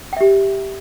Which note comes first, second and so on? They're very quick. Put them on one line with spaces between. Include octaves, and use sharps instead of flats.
G5 E5 G4